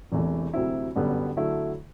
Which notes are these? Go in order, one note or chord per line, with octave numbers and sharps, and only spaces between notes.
E1 E2 C3 E3 A3
D2 C3 F#3 C4 E4
G1 F#2 D3 G3 B3
D3 F#3 A3 E4